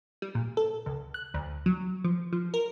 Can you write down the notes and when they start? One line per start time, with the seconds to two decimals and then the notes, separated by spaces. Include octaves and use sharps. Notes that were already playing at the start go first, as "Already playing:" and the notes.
0.22 G3
0.35 A#2
0.57 A4
0.86 C#2
1.14 F#6
1.34 D2
1.66 F#3
2.04 F3
2.33 F3
2.54 A#4